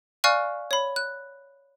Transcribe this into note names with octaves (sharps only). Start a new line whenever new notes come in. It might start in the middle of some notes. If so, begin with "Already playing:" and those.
D5 F5 G#5 C#6 F6 F#6
C#5 B5
F#6